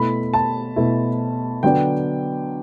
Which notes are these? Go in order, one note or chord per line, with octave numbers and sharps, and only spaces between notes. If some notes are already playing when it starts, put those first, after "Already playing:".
Already playing: B2 A3 E4 B5
A5
B2 A3 E4
D3 F#3 B3 D4 G5